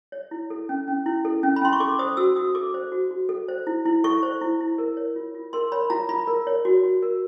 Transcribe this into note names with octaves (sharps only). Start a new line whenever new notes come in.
C#5
E4
A4
C#4
C#4
E4
A4
C#4
B5
C#4 C6
C#6
A4 D6
C5 D#6
F#4 E6
F#4 D#6
A4 D6
C5
F#4
F#4
A4
C5
E4
E4
A4 C#6
C5
E4
E4
A#4
C#5
F4
F4
A#4 C6
C#5 B5
F4 A#5
F4 B5
A#4
C#5
F#4
F#4
A#4